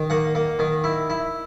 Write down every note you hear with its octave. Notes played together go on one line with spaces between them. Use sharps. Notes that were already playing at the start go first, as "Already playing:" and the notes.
Already playing: D#3
A#3 F#5
A#3
D#3
E4
E4